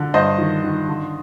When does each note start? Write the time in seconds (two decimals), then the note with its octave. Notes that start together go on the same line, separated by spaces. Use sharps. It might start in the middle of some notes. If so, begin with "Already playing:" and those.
Already playing: D3
0.14 G2 C5 D#5
0.38 D#3
0.64 D#3
0.88 D3